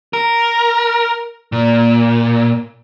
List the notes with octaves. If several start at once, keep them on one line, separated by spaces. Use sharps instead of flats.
A#4
A#2